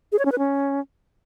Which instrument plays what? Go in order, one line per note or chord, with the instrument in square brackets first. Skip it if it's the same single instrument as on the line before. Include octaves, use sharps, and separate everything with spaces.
[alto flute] G#4
C#5
C#4
B4
C#4